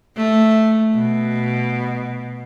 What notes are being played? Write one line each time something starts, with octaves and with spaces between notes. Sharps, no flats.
A3
B2